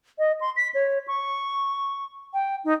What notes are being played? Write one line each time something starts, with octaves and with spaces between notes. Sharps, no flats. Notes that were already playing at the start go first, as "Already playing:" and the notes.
D#5
C6
B6
C#5
C#6
G5
D#4